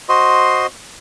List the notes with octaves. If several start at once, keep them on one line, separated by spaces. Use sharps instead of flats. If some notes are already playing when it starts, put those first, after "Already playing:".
F#4 C5 D#5 C6